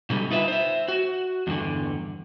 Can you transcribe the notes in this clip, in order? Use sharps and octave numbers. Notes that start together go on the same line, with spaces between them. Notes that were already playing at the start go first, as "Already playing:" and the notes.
B2 D3 E3 G3
D#4 F4 B4 E5
C5 E5
F#4
E2 G2 D3